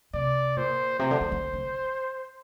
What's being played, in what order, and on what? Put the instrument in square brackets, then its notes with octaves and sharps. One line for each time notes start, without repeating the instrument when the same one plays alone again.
[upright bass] C3 [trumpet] D5
[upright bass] A#2 [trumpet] C5
[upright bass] C3 [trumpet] C5
[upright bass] D3
D3
D3
D3